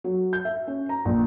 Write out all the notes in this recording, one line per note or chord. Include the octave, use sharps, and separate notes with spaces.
F#3
G6
E5
C#4
A#5
A#1